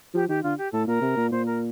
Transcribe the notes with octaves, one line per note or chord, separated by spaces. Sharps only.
F3 G4
D#3 G4
D3 F4
G4
A2 A4
A#2 A#4
C3
A#2
A#2 C5
A#4